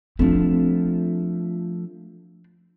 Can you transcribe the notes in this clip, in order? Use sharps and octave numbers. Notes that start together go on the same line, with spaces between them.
F3 A3 C4 D4